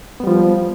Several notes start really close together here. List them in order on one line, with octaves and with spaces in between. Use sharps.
B3 G3 F3